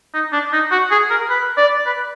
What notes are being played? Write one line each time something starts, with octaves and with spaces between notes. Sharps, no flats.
D#4
D4
D#4
F#4
G#4
A#4
B4
D5
B4